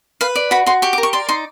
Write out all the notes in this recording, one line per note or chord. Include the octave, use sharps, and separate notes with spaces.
B4 F5
D5
F#4 B5
F#4 C6
G4 C#6
D6
A#4
C#6
D5 C6
D#4 C6